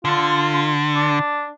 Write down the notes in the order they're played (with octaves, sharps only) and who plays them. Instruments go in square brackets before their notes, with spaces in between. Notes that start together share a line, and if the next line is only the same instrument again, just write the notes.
[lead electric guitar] D3 [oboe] F4
[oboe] D4